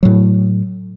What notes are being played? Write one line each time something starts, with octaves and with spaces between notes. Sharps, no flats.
A2 F#3